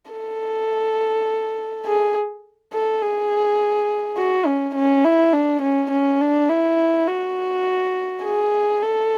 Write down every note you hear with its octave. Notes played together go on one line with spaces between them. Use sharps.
A4
G#4
A4
G#4
F#4
C#4
C#4
E4
D4
C#4
C#4
D4
E4
F#4
G#4
A4